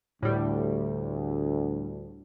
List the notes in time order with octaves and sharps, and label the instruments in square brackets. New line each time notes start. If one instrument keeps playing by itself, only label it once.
[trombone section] D2 [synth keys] A2 G3